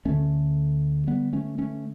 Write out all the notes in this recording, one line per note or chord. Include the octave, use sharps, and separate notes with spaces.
D2 D3 A3 C#4
G3 B3
A3 C#4
A3 C#4